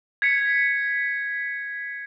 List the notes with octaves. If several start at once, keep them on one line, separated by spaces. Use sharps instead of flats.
G#6 B6 C#7